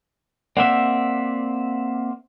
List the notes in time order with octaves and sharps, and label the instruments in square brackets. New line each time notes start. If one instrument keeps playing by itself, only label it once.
[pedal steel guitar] A#3 C4 E5 [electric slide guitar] D5 F#5